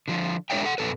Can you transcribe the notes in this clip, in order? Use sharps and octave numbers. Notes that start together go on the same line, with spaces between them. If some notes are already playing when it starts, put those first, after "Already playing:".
D3 F3 F4
G#3 D4 A#4 C#5 E5 G5
A4 F#5
F#2 B2 E3 A4 B4